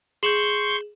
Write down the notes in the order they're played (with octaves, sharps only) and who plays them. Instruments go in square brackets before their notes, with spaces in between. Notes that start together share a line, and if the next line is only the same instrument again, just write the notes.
[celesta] G#4 E7 F#7 [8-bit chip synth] C6 C#6 G6